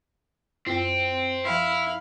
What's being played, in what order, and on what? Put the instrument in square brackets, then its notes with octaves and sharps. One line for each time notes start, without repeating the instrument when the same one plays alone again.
[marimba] F#2 F4 [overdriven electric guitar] C4
[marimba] F3 C6 [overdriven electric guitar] E4 [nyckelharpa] F5 B5